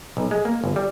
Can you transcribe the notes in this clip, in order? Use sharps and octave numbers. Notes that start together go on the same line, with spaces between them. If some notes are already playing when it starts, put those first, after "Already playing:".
B1
G#3
A#3
G1
G3